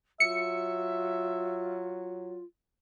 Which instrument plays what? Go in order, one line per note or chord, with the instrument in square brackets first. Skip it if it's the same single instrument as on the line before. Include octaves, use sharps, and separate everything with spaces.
[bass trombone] F#3 [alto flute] F4 [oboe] E5 [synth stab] C#7